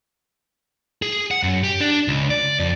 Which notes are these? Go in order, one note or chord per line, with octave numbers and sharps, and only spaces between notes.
G#4
F#5
F#2
G4
D4
C#2
D5
F2